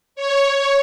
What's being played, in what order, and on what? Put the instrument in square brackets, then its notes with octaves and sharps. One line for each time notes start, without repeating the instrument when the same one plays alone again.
[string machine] C#5